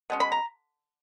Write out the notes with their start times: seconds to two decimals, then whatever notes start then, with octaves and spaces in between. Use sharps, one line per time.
0.10 B2 G#3 C#4
0.20 B5
0.32 A#5